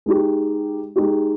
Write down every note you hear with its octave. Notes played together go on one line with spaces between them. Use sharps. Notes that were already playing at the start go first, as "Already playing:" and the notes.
G#3 D#4 G4
G#3 D#4 G4